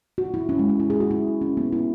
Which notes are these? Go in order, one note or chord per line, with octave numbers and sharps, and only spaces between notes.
F#4
E4
C#4
G#3
C#4
E4
G#4
F#4
E4
C#4
B3
E4